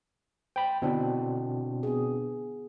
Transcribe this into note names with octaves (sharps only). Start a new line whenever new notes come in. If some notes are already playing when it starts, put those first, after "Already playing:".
C5 G5 B5
B2 D3 B3 C4 D4 E4
B3 G#4